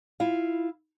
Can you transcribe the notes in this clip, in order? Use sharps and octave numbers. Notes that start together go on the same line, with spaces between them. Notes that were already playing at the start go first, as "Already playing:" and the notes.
E4 F4 F5